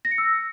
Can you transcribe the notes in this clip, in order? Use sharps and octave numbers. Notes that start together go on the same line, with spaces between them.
A#6
C#7
E6